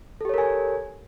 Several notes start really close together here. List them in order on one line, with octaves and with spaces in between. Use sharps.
A4 G4 C#5 A#4 G#5